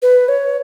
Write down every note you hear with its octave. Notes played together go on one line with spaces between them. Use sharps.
B4
C#5